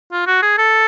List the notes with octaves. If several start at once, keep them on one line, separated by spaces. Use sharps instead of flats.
F4
F#4
G#4
A4